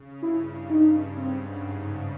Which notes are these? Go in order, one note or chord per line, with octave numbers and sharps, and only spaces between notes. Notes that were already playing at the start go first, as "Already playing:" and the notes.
Already playing: C#3
G2 E4
G2 D#4
G#2 C4